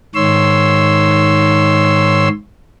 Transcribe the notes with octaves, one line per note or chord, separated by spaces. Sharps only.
G#2 D#3 C#5 C6 E6